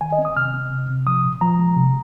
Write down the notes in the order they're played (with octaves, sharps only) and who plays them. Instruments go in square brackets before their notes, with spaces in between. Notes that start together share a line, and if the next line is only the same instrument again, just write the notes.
[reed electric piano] D#3 G#5
D#5
C4
D#6
C3 F6
C4
C3
C3
F3 D#6
A#2
F3 A#5
G#3
C3